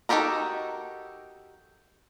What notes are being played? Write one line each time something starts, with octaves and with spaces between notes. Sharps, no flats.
D#4 F#4 G4 A4 A#4